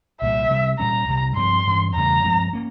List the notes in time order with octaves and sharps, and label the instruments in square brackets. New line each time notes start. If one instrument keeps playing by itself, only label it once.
[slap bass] C2 A#2 G3 [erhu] E5
[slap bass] C3 G3 C4
[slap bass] A#2 G3 C#4 [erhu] A#5
[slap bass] C2 C3 G3
[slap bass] G2 F3 C4 [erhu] C6
[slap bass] G2 E3 A#3 C#4
[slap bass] E2 C#3 G3 [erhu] A#5
[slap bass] G2 F3 G#3 C4
A#3 C#4